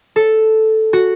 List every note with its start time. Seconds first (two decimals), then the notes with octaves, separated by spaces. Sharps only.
0.16 A4
0.93 F#4